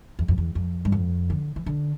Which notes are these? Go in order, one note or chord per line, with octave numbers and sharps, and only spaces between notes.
E2
F2
E2
F2
G2
F2
D3
E3
D3